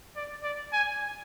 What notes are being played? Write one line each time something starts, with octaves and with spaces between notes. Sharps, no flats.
D5
D5
G#5